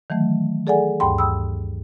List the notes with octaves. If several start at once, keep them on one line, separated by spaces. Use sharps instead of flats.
D#3 E3 F#3 A3
G#4 A4 D5 F#5 G#5
D2 G2 G5 B5 C6
G5 B5 D#6 E6